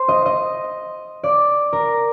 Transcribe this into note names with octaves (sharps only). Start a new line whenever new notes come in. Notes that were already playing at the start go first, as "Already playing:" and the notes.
Already playing: C5
D#5
D#5
D5
A#4